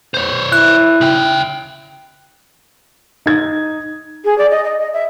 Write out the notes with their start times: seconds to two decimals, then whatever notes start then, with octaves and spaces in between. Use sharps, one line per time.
0.14 C5 C#5
0.52 E4 F#6
1.01 C#3 G5
3.26 D#4 G#6
4.25 G#4
4.38 D5
4.51 D#5
4.64 D#5
4.79 D#5
4.93 E5